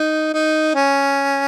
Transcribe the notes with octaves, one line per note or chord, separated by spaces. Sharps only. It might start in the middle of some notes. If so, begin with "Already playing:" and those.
Already playing: D#4
D#4
C#4